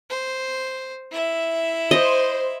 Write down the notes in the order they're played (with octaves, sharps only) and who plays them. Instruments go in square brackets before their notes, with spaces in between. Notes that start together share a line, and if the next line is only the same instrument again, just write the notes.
[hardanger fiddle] C5
E4 E5
[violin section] C5 [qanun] D#5